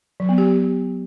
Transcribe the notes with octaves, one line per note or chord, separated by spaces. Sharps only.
F#3
B3
G4